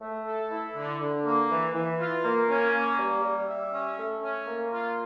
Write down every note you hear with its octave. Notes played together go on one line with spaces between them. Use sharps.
A3
A4
E4
D3
D3
A#3
E3
E3
F4
A#3
C#4
A#3
G3
G3
E5
C#4
A3
C#4
A#3
F4